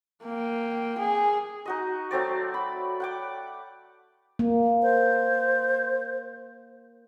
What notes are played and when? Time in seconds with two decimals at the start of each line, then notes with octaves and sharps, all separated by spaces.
0.24 A#3 G5
0.98 G#4
1.65 D#4 F#4 D#5
2.11 F#3 A3 C4 D5
2.54 B5
3.00 F#5 G5 D6
4.39 A#3
4.83 C5